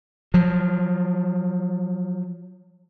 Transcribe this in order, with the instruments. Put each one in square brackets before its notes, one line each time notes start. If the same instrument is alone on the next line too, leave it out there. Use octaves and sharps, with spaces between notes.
[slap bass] F3 F#3